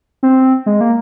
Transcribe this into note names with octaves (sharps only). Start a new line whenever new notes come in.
C4
G#3
A#3